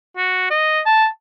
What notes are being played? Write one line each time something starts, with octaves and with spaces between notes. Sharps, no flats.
F#4
D#5
A5